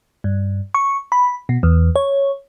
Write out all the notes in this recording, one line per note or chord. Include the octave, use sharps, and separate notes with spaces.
G2
C#6
B5
B2
E2
C#5